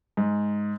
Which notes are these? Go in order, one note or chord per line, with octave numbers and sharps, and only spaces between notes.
G#2